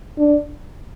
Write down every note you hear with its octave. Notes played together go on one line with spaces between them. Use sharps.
D4